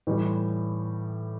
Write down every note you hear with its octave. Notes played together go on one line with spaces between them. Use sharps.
A2 E3 G3